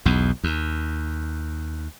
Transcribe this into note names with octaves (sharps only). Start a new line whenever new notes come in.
B1 E2
D#2